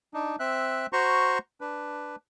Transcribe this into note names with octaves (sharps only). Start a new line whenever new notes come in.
D4 D#4
C4 E5 F#6
F#4 C5 A#5 C6 C#6
D4 B4